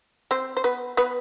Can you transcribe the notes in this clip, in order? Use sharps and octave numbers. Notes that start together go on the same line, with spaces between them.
C4 C5
C5
B3 B4
B3 B4